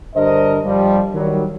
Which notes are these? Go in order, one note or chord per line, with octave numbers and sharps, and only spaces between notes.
G2 D3 D4 A#4 C5 D#5
G2 F3 G3
D#3 F#3 G3